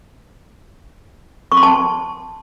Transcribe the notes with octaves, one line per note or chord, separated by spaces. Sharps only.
C#6
C6
A5